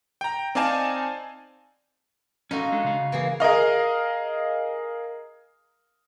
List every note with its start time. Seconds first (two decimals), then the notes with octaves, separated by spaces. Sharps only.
0.21 G5 A#5
0.55 C4 D#4 D5 F5 G#5 A5
2.51 C#4 D#4 F4 F#4 A4
2.72 G#3 D4 A4
2.84 C#3 F5
3.12 E3 A#3 G#4
3.40 G#4 A#4 D#5 F5